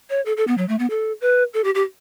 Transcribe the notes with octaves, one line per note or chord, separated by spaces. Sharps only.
C#5
A4
A4
B3
F#3
A3
B3
A4
B4
A4
G4
G4